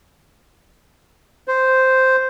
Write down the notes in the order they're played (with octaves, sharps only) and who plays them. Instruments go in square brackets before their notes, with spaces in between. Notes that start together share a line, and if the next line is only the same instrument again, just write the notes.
[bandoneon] C5